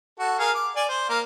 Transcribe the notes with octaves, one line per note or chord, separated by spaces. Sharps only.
F#4 A4
G#4 A#4 F5
D6
D5 G#5
C5
A#3 F5